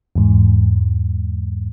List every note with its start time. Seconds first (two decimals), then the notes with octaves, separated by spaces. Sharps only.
0.16 E2 G#2